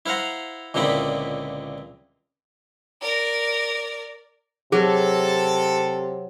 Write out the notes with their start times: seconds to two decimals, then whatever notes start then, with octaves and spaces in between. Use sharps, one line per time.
0.06 E4 C5 F5 F#5 A#5
0.74 C#2 A#2 D3 C4 E4 B5
3.02 A#4 D5
4.72 C3 F#3 G#4 A4